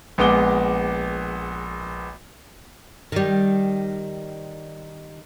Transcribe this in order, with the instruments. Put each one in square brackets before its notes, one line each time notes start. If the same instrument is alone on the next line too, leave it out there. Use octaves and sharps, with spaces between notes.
[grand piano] A#1 G#3 B3 F#5 D6 G7
[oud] D#3 G3